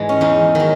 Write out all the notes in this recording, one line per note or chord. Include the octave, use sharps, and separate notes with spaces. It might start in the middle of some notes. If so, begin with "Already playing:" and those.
Already playing: G#2 E3 G#3
C#4
E2 D#4
D#3 F#3